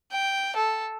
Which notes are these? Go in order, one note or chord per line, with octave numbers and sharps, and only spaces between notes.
G5
A4